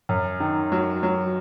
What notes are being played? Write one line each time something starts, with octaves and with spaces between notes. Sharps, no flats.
F#2
D#3
F#3
F#3